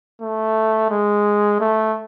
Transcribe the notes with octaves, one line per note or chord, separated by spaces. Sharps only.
A3
G#3
A3